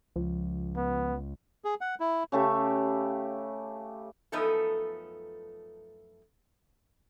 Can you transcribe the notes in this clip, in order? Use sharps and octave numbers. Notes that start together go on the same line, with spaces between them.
C#2 F3
B3
G#4
F#5
E4
C#3 A3 G4
F#2 F3 A3 B3 D#4 A4